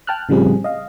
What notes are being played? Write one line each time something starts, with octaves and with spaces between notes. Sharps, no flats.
G5 A5 F6 F#6
A2 C#3 F3 G3 C4 G#4
D#5 F5